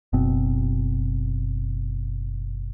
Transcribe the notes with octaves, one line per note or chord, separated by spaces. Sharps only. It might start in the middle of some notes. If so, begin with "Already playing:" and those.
F#1 B2 C4